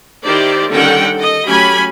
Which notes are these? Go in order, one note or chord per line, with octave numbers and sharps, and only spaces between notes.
D#3 E4 G4 C5 D5
D3 D#3 G3 C#4 F#5 G5
A4 D#5
F#3 A3 C#4 G4 G#5 B5